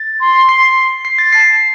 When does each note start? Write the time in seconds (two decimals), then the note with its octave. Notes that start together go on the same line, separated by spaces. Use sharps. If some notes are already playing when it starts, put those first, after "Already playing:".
Already playing: A6
0.20 C6
0.49 C7
1.05 C7
1.19 A6
1.32 A5 C7